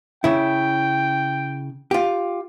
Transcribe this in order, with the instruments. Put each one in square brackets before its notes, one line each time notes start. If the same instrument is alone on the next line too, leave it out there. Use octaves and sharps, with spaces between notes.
[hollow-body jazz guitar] C#3 E4 [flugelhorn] G5
[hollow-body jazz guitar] F4 G4